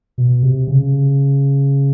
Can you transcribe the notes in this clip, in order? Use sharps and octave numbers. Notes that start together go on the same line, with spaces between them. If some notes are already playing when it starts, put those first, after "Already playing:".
B2
C3
C#3